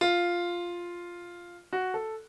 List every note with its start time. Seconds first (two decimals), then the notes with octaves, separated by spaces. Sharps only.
0.01 F4
1.73 F#4
1.94 A4